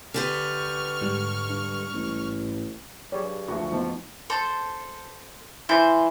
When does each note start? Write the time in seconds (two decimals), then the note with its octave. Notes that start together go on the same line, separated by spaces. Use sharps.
0.14 D3 G4 B4 C#6 F6
1.01 G#2 G3
1.50 G2
1.94 A1
3.12 F#3 G3 G#4 C#5
3.24 G2
3.48 D2 D3 F3 F#4 C#6
3.72 A1 F2 F3 B3 D#4
4.30 A4 C5
5.69 E3 C5